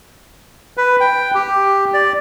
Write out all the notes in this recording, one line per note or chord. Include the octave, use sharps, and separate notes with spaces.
B4
G5
G4
D5